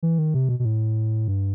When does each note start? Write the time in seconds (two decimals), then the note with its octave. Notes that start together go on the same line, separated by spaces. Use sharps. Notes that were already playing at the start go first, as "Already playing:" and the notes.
0.03 E3
0.18 D#3
0.34 C3
0.49 B2
0.59 B2
0.65 A2
1.28 G2